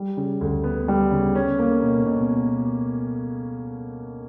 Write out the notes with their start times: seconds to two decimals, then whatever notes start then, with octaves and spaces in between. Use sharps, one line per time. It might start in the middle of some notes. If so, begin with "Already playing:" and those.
Already playing: G3
0.17 C#3
0.41 D2
0.64 B3
0.88 G3
1.11 C#3
1.35 C#4
1.59 A#3
1.83 B2
2.06 B2